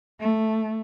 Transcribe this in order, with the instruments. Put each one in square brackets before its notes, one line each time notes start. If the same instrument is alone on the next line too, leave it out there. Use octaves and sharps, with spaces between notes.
[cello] A3